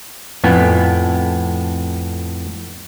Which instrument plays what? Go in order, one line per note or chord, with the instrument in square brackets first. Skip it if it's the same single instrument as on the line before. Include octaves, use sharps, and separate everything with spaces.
[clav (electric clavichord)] F2 A2 B3 G#5